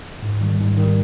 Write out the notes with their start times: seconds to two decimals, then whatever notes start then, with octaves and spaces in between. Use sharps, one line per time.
0.23 G#2
0.41 D#3 G3
0.60 G#2
0.77 D#3 G3